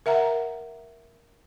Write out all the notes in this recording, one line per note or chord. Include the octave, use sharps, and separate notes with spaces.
A#4 E5 F#5 A#5